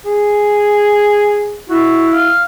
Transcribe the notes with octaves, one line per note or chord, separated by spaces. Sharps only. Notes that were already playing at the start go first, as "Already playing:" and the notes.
G#4
E4 F#4
F5